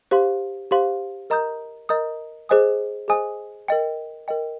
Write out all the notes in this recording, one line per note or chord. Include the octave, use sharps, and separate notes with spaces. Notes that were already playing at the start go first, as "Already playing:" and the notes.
G4 C5 F5 C6
G4 C5 F5 C6
A#4 D#5 A#5 D#6 G6
A#4 D#5 A#5 D#6 G6
G#4 C5 D#5 G#5 D#6
G#4 C5 D#5 G#5 D#6
A#4 D#5 G5
A#4 D#5 G5